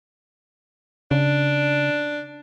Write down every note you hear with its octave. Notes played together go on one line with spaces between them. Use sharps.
C#3 D4